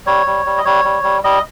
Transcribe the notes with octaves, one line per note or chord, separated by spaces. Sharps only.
G3 C#5
G3
G3
D#5
G3 C#5
G3
G3
G3 D#5